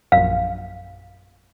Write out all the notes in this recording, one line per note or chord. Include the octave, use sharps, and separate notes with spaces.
A#1 F#2 F5